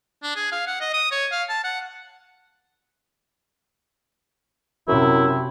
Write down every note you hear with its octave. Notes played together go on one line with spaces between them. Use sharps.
D4
G#4
F5
F#5
D#5
D#6
C#5
F5
A5
F#5
F#2 C3 E4